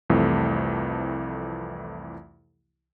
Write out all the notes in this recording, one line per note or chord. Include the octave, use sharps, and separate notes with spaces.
C2 F2 E3 A3